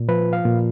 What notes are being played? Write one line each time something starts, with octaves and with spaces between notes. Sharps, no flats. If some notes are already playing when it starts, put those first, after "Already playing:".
Already playing: A#2
F3 B4
F5
A#2